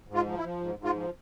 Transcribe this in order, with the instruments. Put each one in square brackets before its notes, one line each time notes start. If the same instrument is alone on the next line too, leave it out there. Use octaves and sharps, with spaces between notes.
[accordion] G#2
F4
F3
E4
F3
G#2
G#2
F4
F3